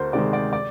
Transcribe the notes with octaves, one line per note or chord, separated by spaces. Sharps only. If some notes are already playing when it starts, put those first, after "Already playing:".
Already playing: D2 A#4 C5
C3 D#3 G#3 D5
D5
D5